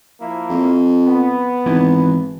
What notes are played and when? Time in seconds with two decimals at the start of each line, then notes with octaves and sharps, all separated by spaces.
0.20 F3 A#3 E4
0.50 F2
1.02 B3
1.66 G#1 E3